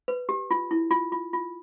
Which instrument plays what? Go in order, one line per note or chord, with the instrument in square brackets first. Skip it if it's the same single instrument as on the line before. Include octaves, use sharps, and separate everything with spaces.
[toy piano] B4
G4
F4
E4
F4
F4
F4